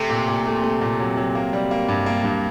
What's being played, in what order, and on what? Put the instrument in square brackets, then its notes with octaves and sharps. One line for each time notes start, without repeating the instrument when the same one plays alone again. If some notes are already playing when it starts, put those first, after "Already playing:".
Already playing: [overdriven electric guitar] C3 [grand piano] A3
[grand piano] A#2
A#2
A3
A3
A#2
F#3
F#3
A#3
G3
A#3
G2
A#3
G2